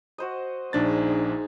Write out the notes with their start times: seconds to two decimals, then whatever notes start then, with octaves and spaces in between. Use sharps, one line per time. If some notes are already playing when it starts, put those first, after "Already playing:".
0.18 F#4 C5 D#5
0.73 A#1 D4 D#4 G#4 C5 A6